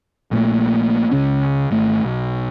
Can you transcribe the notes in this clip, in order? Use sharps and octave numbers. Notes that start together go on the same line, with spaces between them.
A#1 A#2 A3
C#2 C#3 C#4
G#1 A3
B1